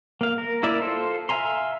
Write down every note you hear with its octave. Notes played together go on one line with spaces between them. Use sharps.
A#3 F5
A#4
A#3 E4 A#4 D5 E5
F4 A4 C5
E5 F5 G#5 A#5 C6